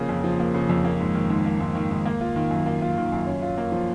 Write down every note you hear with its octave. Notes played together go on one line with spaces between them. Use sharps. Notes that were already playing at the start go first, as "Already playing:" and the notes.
Already playing: C#3 F3 A#3
F2
F3
A#3
C#3
F2
A#3
G#2
D#3
G#2
A#3
G#2
D#3
G#2
A#3
F4
D#3
F#2
A#3
F4
D#3
F#2
C#4
F4
A#3
F3